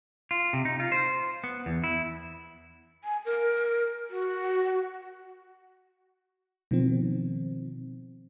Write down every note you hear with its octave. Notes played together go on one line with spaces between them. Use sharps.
F4
C3
D#4
F4
C5
B3
E2
E4
G#5
A#4
F#4
B2 D#3 F3 C4